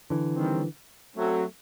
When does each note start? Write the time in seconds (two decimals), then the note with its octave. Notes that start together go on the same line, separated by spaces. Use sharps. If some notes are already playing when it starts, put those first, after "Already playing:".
0.10 D3 E3
0.32 D#3 G3 C4
1.15 F#3 A3 C4